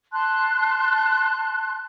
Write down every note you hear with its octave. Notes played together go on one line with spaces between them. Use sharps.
A5 C6 F#6